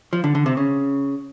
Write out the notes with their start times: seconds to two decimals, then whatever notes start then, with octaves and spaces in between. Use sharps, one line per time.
0.13 F3
0.24 D3
0.35 D3
0.46 C3
0.57 C#3